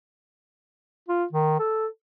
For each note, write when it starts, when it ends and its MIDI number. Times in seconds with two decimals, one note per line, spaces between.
1.09 1.24 65
1.33 1.58 51
1.60 1.87 69